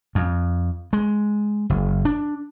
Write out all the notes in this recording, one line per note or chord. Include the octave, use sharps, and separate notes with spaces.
F2
G#3
F#1
D4